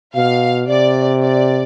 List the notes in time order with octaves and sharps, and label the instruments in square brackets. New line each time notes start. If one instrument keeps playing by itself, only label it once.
[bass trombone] B2 [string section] F5
[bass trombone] C3 [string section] D5
[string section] D5